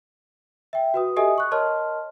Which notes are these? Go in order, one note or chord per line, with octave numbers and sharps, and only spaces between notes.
E5 G5
F#4 B4 D#6
G4 A4 D#5 E5 G#5 D#6
C#6 F#6
A#4 C#5 D#5 A5 C6 F6